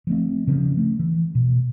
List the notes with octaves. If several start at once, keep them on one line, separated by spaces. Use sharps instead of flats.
F3 A3 C4
C#3 F3 C#4
A3
E3
B2